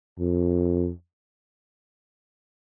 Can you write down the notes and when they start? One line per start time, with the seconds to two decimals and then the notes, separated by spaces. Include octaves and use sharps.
0.19 F2